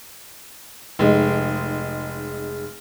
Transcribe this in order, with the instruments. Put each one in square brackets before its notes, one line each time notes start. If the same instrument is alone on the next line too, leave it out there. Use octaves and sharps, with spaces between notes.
[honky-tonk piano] F1 G#3 D#4